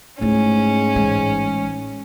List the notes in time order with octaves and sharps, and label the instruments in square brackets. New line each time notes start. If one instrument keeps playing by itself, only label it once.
[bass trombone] G#2 [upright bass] A3 E4 [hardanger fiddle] C#4
[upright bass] A1 G#3